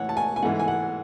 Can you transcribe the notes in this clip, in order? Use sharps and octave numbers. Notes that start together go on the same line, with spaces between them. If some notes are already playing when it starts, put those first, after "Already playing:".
Already playing: A2 E3 C#5 F#5
A5
G#5
G#5
G#2 E3 A3 F#5
G#5
F#5